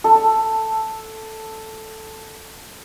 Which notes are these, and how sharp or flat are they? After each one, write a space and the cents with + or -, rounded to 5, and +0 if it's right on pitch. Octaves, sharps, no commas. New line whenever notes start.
A4 +0 E6 -30